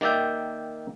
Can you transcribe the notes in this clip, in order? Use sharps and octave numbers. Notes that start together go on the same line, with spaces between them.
D#3 A#3 D5 E5 G5